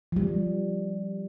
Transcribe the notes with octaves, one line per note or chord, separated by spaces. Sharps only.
F3 G3